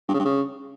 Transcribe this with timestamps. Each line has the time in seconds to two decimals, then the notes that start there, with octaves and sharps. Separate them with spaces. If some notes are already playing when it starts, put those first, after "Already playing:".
0.09 G2
0.14 C#3
0.20 G2
0.25 C#3